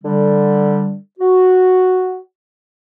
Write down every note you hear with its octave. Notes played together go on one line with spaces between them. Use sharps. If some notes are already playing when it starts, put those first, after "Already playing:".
D3 G3
F#4